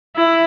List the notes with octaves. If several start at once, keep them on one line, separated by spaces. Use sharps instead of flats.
E4